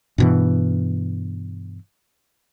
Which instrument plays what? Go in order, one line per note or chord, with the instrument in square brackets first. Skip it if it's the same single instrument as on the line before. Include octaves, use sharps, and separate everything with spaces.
[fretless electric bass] G2 B2 E3